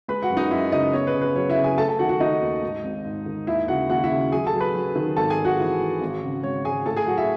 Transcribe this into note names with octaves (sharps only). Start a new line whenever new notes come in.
G#3 B4 B5
F#4 F#5
F#2
D#4 D#5
F#2 E4 E5
C#3 D#4 D#5
B3 C#5
B4
C#3
B4
F#3 C#5
E4 E5
C#3
G#4 G#5
A3 A4 A5
A4 A5
D#3 F#4 F#5
F#4 F#5
D#3 D#4 D#5
D#2
G#2
G#1
G#2
D#3
D#2 E4 E5
C#3 F#4 F#5
D#2 F#4 F#5
E4 E5
C#3
F#3 G#4 G#5
A4 A5
F#3
B4 B5
F#3
D#3
G#1 A4 A5
G#4 G#5
G#1
F#4 F#5
E3
G#3
G#1
C#3
G#1 C#5
G#1 G#4 G#5
A2 A4 A5
G#4 G#5
F#3 F#4 F#5
E4 E5